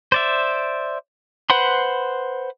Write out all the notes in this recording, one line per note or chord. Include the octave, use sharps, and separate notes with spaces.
C5 D5 E5
B4 C5 F#5 B5 C6